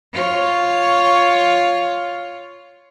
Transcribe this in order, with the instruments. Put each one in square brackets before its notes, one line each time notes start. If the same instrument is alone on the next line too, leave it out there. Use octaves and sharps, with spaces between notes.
[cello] F4 C#5